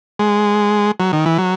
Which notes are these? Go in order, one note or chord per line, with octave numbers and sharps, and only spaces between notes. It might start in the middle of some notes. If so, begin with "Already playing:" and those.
G#3
F#3
D#3
E3
F#3